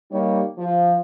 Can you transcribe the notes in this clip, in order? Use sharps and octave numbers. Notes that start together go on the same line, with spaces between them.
G3 A#3 D#4 G4 C#5
F3